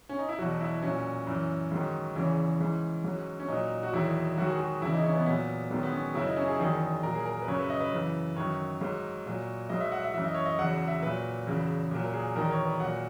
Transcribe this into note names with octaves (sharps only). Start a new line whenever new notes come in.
C#4
D#4
E4
E2 B2 F#3 F#4
E4
A#2 F#3 C#4
F#2 E3
G#2 D#3 F#3
E2 C#3 E3 C#4
G#2 E3
G#2 F#3
C#4
A#2 F#3 D#4
F#4
E2 D#3 F#3 E4
G#2 D#3 F#3 F#4
G#4
F#4
E2 C#3 E3 E4
D#4
C#4
B3
A#2 F#3 B3
G#2 D#3 F#3 B3
B3
C#4
F#2 C#3 F#3 E4
D#4
C#4
G#4
E2 D#3 F#3 G#4
A#2 F#3 A#4
G#4
A#4
B4
F#2 C#3 F#3 C#5
B4
D#5
B4
F#2 C#3 E3
F#2 D#3 F#3 C#5
G#2 F#3
A#2 F#3
G#2 F#3 D#5
E5
F#5
E5
F#2 E3 E5
D#5
C#5
D#5
E2 C#3 F#3 F#5
E5
A#2 F#3 B4
E2 C#3 F#3
A#2 F#3
A#4
G#4
E2 D#3 F#3 A#4
C#5
B4
A#2 F#3 F#5